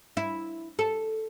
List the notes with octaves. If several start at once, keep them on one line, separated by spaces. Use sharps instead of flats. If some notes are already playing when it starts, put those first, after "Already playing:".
E4
A4